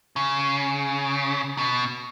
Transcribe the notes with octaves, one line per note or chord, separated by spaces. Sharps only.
C#3
B2